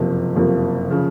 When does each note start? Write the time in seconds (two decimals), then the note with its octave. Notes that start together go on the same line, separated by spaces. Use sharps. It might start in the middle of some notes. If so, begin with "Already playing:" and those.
Already playing: F#1 F2 C3 F3 A#3
0.35 F#1 F2 C3 F3 A#3
0.90 C#3 F3